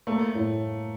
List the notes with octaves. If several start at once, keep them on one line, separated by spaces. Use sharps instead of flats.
A3 A#3
A2